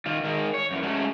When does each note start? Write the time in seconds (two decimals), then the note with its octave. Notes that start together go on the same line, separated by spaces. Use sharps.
0.06 D#3 F4
0.24 D#3 G#3 A#4
0.54 C#5
0.71 F#2 E3
0.83 F#3 G#3 A3 C#4